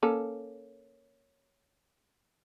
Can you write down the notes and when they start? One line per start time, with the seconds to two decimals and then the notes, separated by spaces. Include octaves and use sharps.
0.03 A#3 C#4 A4